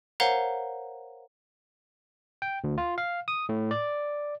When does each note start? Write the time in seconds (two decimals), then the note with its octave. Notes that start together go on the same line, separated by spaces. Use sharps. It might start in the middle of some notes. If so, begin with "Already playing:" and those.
0.20 A#4 C5 C#5 F5 F#5 A#5
2.42 G5
2.64 D2
2.78 F4
2.98 F5
3.28 D#6
3.49 A2
3.71 D5